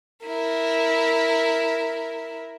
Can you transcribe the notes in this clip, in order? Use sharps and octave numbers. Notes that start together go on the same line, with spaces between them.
E4 A#4